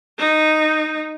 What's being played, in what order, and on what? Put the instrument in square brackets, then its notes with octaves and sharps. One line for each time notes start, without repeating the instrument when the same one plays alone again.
[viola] D#4